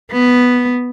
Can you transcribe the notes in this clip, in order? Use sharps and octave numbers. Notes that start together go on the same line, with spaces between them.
B3